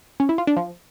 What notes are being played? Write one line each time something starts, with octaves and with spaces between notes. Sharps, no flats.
C#4
E4
F4
D4
F3